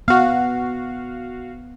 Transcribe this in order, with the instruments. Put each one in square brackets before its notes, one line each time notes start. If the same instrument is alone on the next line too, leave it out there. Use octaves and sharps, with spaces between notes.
[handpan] B3 [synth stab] F#4 F5